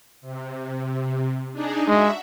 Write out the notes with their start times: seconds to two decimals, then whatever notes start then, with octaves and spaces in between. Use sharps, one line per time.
0.21 C3
1.52 D4 D#4 G#4
1.88 G#3 F#4 E5